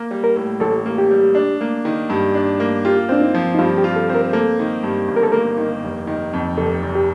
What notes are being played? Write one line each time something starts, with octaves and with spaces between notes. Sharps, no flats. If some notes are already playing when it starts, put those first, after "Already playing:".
Already playing: A#3
G3
A#4
A2
A1 A4
A#3
G4
G3
D4
A#3
D#3
G2
D4
A#3
F4 G4
C4 D4
D#4
F3
D#4
G2 F4
G4
F4
A4
C4
A#4
A#3 A4
D#3
G2
G1
A#4
A4
A#3 A#4
D#3
F1
D#3
F2
F1 A4
F1
G4